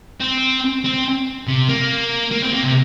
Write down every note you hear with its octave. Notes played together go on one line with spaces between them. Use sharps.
C4
C4
C3
A#3
A#3
C4
A#3
C3